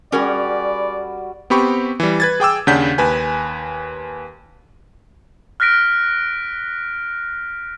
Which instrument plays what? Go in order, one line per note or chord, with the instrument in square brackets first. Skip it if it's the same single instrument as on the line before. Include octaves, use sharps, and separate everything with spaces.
[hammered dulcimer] G3 F#4 [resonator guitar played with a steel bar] C#4 G#4 A#4 [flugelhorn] D5
[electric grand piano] B3 C4 G4 B5 C#6
E3 G3
B4 G#6 A6
G#4 G5 D6 E6
D#2 C#3 D4 F#5 G6 B6
D#2 B4 G#5
[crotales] F6 F#6 A#6 B6 D7